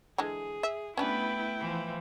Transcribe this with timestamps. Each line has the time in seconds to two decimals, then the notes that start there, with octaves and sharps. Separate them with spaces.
0.18 D3 E3 G#3 G#4
0.63 E5
0.97 A3 B3 C#4 D4 E4 G4 B4 G5
1.59 E3 F3